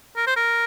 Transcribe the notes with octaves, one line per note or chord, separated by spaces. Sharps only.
A#4
C5
A#4